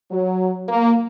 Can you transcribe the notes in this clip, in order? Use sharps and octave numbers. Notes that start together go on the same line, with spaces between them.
F#3
A#3